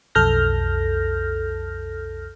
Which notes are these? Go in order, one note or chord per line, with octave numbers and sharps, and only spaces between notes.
B1 F2 A4 F6 G6 A#6